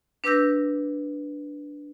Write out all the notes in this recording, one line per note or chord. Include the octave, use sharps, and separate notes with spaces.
D4 B4 D6 E6 G6 A#6